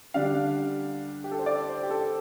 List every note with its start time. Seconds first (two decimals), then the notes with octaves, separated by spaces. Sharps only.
0.14 D3 G3 D4 F5
1.24 G4
1.31 A4
1.39 C5
1.46 D5
1.69 C5
1.83 G4
1.90 A4